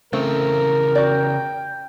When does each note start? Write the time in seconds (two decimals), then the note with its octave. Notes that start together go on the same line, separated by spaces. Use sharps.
0.13 C#3 E3 A3 C4 A#4
0.95 F#4 D5 G5